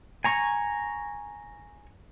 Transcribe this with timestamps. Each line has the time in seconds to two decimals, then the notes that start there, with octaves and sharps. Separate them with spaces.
0.24 G#5 A#5 C#6